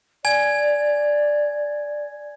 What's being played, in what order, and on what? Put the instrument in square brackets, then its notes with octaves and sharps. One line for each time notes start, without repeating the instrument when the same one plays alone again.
[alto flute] D5 [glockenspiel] G#5 G#6